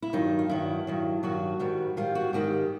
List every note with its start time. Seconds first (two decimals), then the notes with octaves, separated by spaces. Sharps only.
0.02 E4
0.13 G2 D#3 F#3 D#4
0.39 F4
0.49 G2 D#3 F#3 E4
0.87 G2 D#3 F#3
1.23 G2 D#3 F#3 F#4
1.59 G#2 D#3 G3
1.97 G#2 D#3 G3 F4
2.15 F#4
2.33 G#2 D#3 G3 G4